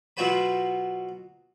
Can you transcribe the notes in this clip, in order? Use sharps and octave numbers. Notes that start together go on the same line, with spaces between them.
B2 F#3 F4 F#4 C5 B5